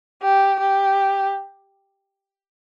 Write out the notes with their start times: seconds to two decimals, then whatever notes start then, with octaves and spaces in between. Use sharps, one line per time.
0.23 G4
0.59 G4